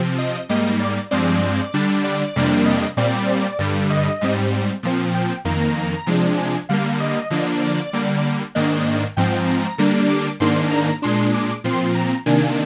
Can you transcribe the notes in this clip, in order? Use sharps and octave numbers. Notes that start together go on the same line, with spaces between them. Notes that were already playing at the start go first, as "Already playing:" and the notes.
Already playing: C3 F3 C4
D#5
G#2 G3 A#3 D#5
D5
G2 F3 G#3 C4 D5
D3 G3 D4
D5
F2 C3 G3 A#3 D4
D#5
A#2 G3 C4 D5
G2 D3 G3
D#5
G#2 G3 C4
A#2 F3 C4
G5
F2 D#3 A#3 A#5
C3 F3 G#3 D4
G#5
D3 G3 A#3 F5
D#5
D3 F3 A#3 D4
D5
D3 G3 A#3
G#2 D#3 A#3 D4 D#5
G#2 F3 C4 G5
A#5
D3 G3 A#3 D4
D6
G#2 D#3 A#3 D4 C6
A#5
A#2 G#3 D4 C6
D6
A#2 F3 C4 C6
A#5
C3 D#3 A#3 D4 G#5